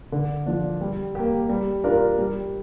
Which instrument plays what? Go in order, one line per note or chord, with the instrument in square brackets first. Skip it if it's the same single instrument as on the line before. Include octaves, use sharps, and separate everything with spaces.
[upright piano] D3
F3 D4
G3
A#3 G4
G3
D4 F4 A#4
G3